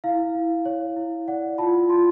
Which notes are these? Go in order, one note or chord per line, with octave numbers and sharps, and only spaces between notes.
E4 F5
E4
C#5
E4
D5 F#5
F4 A5 B5
F4 C6